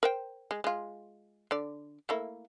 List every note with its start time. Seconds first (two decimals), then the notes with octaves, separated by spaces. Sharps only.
0.03 A#4 C5 G5
0.51 G#3
0.64 G#3 F4
1.51 D3 D5
2.09 A3 A#3 E4